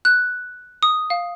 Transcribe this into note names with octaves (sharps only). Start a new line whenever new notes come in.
F#6
D#6
F5